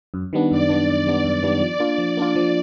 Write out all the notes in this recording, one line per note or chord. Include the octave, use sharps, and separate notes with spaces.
F#2
D#3 G3 B3 D4
F#2 D5
D#3 G3 B3 D4
F#2
D#3 G3 B3 D4
F#2 D5
D#3 G3 B3 D4
F3 D5
A#3 D4 F4
F3
A#3 D4 F4
F3